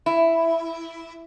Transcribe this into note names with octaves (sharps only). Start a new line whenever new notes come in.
E4